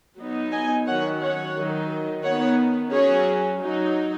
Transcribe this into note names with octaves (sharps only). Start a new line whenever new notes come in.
F#3 B3 D#4
D#5 G#5
D#3 F#3 C#4 C#5 F#5
C#5 F#5
D#3 F#3 D#4
D#3 B3 D#4 C#5 F#5
F#3 C#4 G#4 C#5
F#3 D#4